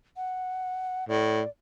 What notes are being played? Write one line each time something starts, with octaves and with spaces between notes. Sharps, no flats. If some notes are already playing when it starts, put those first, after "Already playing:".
F#5
A2 D5